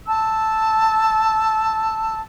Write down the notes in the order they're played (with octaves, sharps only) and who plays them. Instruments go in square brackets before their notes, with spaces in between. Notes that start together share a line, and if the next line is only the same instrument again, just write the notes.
[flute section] A5 E6